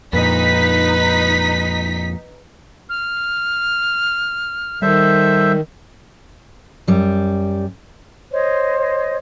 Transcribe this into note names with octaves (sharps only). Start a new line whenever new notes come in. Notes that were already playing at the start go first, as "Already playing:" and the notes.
F2 A#2 D#4 B4 B6
F6
D#3 G3 A4 C5 E5
F#2 G3
C5 C#5 D#5